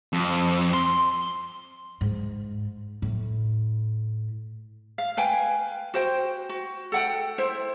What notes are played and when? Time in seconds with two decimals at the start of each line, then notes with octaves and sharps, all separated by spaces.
0.13 F2
0.74 C6
2.01 G#2
3.02 A2
4.98 F5
5.17 B4 F5 G5 G#5
5.94 F#4 C5 G5
6.49 F#4
6.92 A4 F#5 G5
7.38 E4 C5